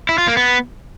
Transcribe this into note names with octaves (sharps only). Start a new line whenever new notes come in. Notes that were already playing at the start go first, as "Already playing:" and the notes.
E4
F4
A#3
B3